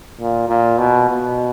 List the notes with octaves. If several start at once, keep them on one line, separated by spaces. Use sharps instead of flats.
A#2
A#2
B2
B2